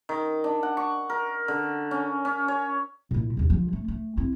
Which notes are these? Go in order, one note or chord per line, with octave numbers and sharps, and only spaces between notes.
D#3
D4
F#5
C#6
A#4
D3
C#4
C#4
C#5
A#2 E4
E1 D#2
D3 F3
A3
A3
C4 E4